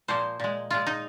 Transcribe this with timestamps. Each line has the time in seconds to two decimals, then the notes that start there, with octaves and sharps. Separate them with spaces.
0.08 A#2 F3 A#3 C5
0.40 A#2 G#3
0.70 A#2 G#3 F4
0.87 D#4